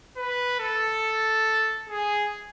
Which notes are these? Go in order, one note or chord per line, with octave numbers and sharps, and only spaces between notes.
B4
A4
G#4